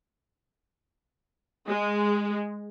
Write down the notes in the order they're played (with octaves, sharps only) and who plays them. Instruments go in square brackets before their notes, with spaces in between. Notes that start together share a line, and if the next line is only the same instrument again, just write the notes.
[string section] G#3